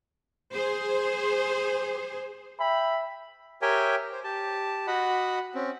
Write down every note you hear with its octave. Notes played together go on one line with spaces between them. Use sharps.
G#4 C5
E5 G5 B5
G4 A#4 C#5 E5 G5 G#5
C5
G4 A5
F#4 D#5 F#5 B5
C4 C#4